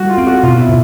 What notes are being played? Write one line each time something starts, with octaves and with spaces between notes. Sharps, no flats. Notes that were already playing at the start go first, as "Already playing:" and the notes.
Already playing: G3 F#4
F4
C4
F#4
B2 F4
E4
B2